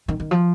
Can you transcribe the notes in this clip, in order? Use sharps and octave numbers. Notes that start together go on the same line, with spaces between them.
D#3
D#3
F3